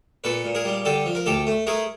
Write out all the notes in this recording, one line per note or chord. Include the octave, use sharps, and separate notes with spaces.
A#2 A4 B4
A#2
G#4 A#4
G3
D3 G4 A4
F3
A#4
D2 G4 A4
A3
A3 G#4 A#4